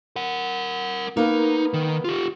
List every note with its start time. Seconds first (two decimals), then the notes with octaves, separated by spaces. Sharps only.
0.16 A#4 F#5
1.17 A#3 B3 D#4 A#4
1.74 D#3
2.04 F4 G4